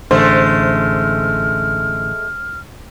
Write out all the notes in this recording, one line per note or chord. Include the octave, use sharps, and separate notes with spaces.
A1 D3 G#3 A3 C5 F6